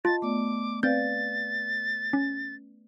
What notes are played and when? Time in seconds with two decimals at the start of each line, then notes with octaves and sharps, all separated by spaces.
0.05 F4 D#5 A5 A6
0.22 A3 B3 D5 D6
0.83 C4 B4 D5 F5 G6 A6
2.13 C#4